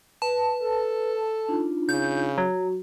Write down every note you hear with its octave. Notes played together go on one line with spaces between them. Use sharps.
B4 A5
A4
D4 D#4 F4
C#3 G6
F#3 F#4